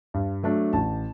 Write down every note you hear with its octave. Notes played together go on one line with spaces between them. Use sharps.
G2
F#3 A3 D4
A1 A5